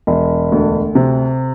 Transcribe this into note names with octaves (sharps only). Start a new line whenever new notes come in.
E1
D2
C3